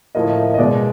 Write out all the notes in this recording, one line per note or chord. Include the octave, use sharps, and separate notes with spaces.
A2 F3 A#3 D#5
D#5
B2 G#3 D5